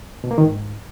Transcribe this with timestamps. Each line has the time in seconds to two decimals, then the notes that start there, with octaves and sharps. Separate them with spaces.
0.24 B2
0.31 A#3
0.38 D#3
0.45 G#2